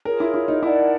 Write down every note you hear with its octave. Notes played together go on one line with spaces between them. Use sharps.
F4 G#4 A#4 C#5
E4
E4
D#4
E4 A#4 D5 F#5 A5